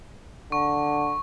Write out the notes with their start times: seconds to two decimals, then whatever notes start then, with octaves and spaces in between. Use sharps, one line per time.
0.52 D3 C#6